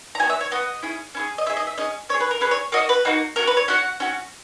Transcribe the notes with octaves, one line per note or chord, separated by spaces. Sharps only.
A#5
B3 F#4 G#5
E5
C#5
B3 F#4 D#5
C#4 E4 G#4
C#4 E4 G#4
D#5
C#4 G#4 E5
D#5
E5
C#4 G#4 D#5
C#4 G#4 C#5
B4
A#4
C#4 G#4 B4
C#5
A#3 D#4 F#4 D#5
B4
A#3 D#4 F#4
C#4 F#4 A#4
B4
C#5
C#4 F#4 F#5
C#4 F#4